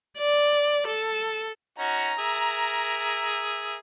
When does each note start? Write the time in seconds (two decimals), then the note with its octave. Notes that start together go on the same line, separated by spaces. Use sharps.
0.18 D5
0.87 A4
1.78 C#4 D#4 F#4 A#5
2.19 G#4 A#4 E5